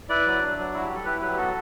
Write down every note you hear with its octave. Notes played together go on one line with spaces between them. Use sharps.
E4 B4 D5
F#3
D4
F#3
E4 F#4
G4
G3
A4
E4 G4 B4
F#3 G4 B4
G4
B3 F#4 A4